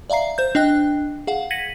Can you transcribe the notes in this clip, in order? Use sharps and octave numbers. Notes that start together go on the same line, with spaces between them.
D5 E5 F5 A#5 C7
C5 G6
D4 D#5 G5 F#6
G#4 F5 F#5
G#6 A#6 B6 C#7 D#7 F#7